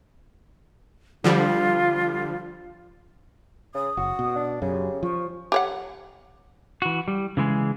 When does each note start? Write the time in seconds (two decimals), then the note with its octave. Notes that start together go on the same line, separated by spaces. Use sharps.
1.24 D3 F3 G3 F4
3.75 C#3 D#6
3.97 F#1 F#4
4.19 B2
4.36 D4
4.62 F#2 C#3 G4
5.03 F3 C#6
5.52 G4 C#5 F#5
6.82 E3 F#4
7.08 G3
7.37 C#3 E3 G#3 G#4